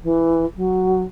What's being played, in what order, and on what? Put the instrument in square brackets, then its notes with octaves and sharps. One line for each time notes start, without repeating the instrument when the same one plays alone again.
[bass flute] E3
F#3